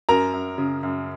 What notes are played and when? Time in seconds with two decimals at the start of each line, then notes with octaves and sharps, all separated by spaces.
0.09 F#2 A#4 A#5
0.33 F#2
0.58 C#3
0.83 F#2